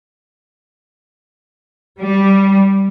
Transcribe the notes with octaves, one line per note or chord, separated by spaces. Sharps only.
G3